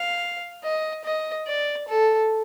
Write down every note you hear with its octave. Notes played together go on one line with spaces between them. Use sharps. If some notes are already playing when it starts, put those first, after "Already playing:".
Already playing: F5
D#5
D#5
D5
A4